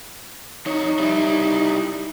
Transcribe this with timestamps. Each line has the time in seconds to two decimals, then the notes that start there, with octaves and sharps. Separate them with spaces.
0.66 F2 D#4 C#5
0.99 G3 E4